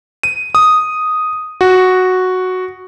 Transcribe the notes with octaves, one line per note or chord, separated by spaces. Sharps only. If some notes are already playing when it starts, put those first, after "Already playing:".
D#7
D#6
F#4